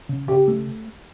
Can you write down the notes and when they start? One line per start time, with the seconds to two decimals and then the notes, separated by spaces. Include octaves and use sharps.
0.09 C#3
0.28 C#3 G4
0.48 A3